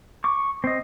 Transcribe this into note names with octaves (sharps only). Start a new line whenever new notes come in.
C#6 D6
C4 D#5